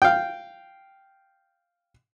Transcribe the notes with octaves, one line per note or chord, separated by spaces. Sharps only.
F5 G5